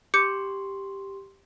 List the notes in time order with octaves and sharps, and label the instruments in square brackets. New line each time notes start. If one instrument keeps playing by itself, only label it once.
[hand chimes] G4 C6 [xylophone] D6 G6 C#7